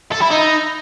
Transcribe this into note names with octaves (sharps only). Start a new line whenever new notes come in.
A4
E4
D#4